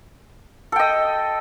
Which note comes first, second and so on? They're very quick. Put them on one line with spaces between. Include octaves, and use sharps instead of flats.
A4 G5 D#5